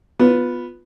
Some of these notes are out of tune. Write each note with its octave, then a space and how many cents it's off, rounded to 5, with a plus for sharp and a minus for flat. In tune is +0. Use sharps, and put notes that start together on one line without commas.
B3 +0 F4 +15